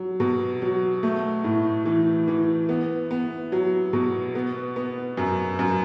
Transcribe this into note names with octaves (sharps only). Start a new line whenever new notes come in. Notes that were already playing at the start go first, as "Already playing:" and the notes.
Already playing: F#3
B2
F#3
A3
A2
E3
E3
B3
B3
F#3
B2
B3
B3
F#2
F#2